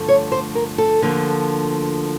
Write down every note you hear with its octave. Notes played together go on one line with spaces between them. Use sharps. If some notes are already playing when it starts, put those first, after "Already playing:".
Already playing: G2 D3 F3 A3
C#5
C5
A#4
A4
D2 D3 F3 A#3